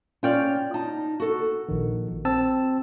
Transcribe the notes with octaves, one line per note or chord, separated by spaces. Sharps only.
C#4 F4 C#5 D5 G5 F6
D#4 A5
F#4 A4
A#1 D#3
C4 A5 E6